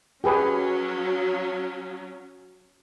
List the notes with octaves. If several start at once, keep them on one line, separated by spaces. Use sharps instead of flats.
F#3 C#4 G4 G#4 B4